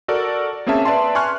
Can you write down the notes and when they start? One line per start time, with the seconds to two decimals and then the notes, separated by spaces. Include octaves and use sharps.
0.08 F#4 A4 A#4 D5
0.67 A#3 C4 C#4 G#4 E5 A5
0.85 B4 D5 E5 A5 C6
1.15 G#5 C6 C#6 F6 F#6